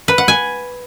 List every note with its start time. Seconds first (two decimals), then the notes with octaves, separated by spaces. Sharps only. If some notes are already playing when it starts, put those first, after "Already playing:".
0.08 B4
0.18 F#5
0.28 G#5